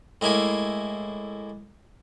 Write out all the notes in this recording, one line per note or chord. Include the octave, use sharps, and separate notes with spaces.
A2 G#3 A#3 E4 G#5